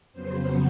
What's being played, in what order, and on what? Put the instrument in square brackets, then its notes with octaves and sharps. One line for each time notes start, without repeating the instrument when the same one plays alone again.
[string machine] F2 C#3 F#3 B3 C5